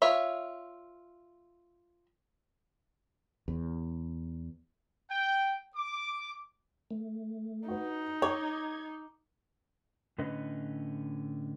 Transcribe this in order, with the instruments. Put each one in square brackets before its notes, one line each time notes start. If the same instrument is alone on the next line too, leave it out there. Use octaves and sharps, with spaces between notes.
[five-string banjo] F4 C#5 E5
[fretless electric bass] E2
[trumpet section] G5
D6
[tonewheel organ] A3
[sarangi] D#4 [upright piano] F#4 B4
[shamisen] C#5 [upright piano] D6 [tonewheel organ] G#6
[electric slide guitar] A2 D3 C#4 B4 D#5